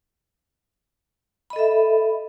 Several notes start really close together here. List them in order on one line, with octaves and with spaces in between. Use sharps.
B5 D#5 A4 E5